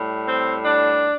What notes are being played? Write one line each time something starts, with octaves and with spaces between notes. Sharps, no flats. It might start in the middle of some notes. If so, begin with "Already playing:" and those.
Already playing: A2 G3
C4
D4